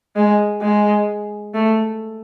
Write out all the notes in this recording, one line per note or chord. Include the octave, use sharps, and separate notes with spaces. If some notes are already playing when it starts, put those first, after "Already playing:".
G#3
G#3
A3